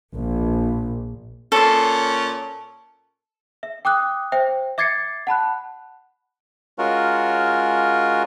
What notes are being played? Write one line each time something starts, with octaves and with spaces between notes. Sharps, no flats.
A#1
A#2 C#4 A4 C6
E5
G5 D6 D#6 F#6
C5 E5 G5
E5 D6 G#6 A6 C7 C#7
F#5 A5 B5 F#6
G#3 C#4 F4 F#4 A#4